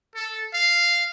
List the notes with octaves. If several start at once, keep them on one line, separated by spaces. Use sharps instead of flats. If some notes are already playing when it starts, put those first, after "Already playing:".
A4
F5